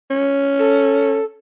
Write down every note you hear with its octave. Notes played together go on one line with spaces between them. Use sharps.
C#4
A4